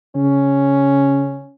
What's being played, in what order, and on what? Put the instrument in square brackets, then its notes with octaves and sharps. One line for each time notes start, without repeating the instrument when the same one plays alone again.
[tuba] C#3 [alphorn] C#4